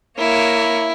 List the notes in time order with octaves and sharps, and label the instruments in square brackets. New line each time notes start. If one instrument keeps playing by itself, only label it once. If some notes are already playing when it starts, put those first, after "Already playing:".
[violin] A#3 C#5 [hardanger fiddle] E4